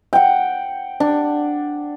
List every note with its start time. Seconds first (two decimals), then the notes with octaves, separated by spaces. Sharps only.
0.13 F#5 G5
1.00 D4